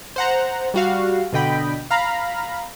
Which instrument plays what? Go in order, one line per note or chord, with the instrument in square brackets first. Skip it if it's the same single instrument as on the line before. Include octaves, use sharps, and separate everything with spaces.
[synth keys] C5 F#5 A#5
G3 F#4 F5
B2 D3 D#5 G5 B5
F5 A#5 B5